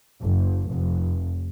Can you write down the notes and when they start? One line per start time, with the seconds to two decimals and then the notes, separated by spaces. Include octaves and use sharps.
0.22 F#1
0.72 F1